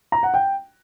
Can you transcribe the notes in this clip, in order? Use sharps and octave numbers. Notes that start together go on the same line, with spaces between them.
A#5
F#5
G5